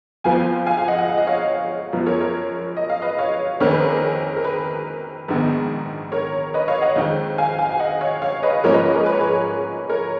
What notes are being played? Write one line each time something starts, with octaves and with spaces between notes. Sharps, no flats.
F2 F3 B3 F5 G#5
F5 G#5
F5 G#5
D#5 F#5
F#5
F5
D#5
C#5 F5
F#2 F3 B3
A#4 C#5
A#4 C#5
D#5
F5
B4 D#5
C#5 F5
F2 D#3 A#3 C#4 A#4 C#5
G#4 B4
A#4
G#4
A#4
A#4
G#4 B4
A#1 G#2 D#3 G#3 B3
A#4 C#5
B4 D#5
C#5 F5
D#5 F#5
F2 D#3 G#3
F5 G#5
F5 G#5
G#5
D#5 F#5
C#5 F5
C#5 F5
B4 D#5
G#2 F3 A#3 C#4 A#4 C#5
B4 D#5
G#4
A#4
B4
C#5
G#4 B4
A#4 C#5